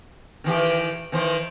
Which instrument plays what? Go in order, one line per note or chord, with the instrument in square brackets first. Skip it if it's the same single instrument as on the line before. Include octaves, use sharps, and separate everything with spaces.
[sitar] D#3 E3 G4
D#3 E3 C5